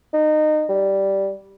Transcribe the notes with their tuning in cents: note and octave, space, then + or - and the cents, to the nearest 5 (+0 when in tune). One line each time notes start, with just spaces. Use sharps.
D#4 -25
G3 -5